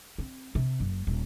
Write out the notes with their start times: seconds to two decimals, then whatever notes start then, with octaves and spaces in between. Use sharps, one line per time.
0.18 C4
0.55 C3
0.80 F#1
1.07 D#1